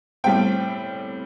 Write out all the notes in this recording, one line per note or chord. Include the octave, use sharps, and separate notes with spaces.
A2 G3 C4 G5